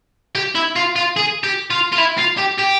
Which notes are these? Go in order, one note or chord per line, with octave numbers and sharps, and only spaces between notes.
G4
E4
F4
F4
G#4
G4
F4
F4
E4
F4
G4
G4